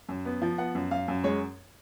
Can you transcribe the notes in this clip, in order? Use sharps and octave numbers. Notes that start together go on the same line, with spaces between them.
F#2
B3
F3
B3 F#5
F#2
F#2 F5
F#2
G#3 C#5